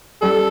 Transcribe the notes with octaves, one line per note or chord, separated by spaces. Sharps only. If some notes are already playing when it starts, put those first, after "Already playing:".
G3 A4